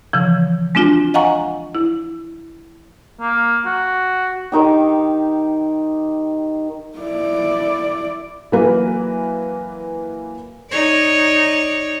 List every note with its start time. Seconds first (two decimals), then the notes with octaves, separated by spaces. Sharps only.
0.13 C#3 E3 F3
0.75 G#3 C4 D4 F4 F#4
1.14 D#5 F5 F#5 G#5 A#5 C#6
1.75 E4
3.21 A#3
3.65 F#4
4.52 D#3 D#4 G4
6.98 E4 D5
8.52 E3 F#3 A#3 A#4 B4
10.71 D#4 C#5 D5